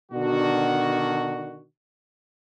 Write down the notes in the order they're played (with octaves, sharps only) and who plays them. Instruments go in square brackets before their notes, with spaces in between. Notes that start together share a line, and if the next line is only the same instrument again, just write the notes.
[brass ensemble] B2 D3 D#3 D4 F#4